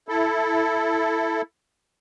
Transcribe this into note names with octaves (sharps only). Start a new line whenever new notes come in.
E4 A4